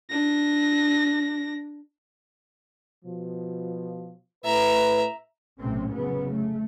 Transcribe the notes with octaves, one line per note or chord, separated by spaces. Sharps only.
D4 A#6
B2 F3
A2 B4 E5 A#5
B1 A2 C3 A3 C4 C#4
F1 C#3 F#3 B3
A3